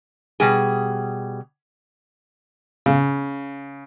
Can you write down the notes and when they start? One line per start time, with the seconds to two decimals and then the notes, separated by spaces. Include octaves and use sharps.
0.40 B2 G3 G#4
2.86 C#3